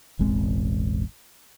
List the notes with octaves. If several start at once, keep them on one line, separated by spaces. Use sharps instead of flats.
E1 A1 G#3 C4